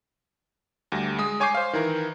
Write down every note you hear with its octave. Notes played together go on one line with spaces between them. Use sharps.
D2 G3 A#6
G#3 D#6
C#5 G#5 C#6 D6 G6 C7
C5 F5
D#3 E3 A#4